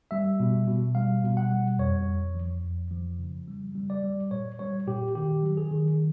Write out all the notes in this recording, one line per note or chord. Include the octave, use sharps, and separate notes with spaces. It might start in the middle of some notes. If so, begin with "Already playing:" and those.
G3 E5
B2
B2
G3 F5
B2
F#5
G3
F2 C#5
F2
F3
F2
F3
C#3
G3
G3
D5
G3
A#2 C#5
G3 C#5
A#2 G4
D#3 G4
F#3
G#4
D#3